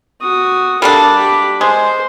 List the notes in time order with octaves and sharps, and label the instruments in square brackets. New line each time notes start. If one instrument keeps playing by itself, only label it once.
[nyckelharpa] F#4 D#6
[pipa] G3 A#3 D4 [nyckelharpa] A4 A5
[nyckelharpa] G4 B5
[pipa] G#3 [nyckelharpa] C5